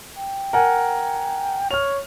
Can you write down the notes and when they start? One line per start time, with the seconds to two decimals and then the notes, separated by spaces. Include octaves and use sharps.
0.17 G5
0.53 A#4 F#5 G#5
1.71 C#5 F6 F7